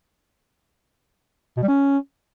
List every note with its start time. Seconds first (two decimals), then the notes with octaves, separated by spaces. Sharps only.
1.57 B2
1.63 G3
1.68 C#4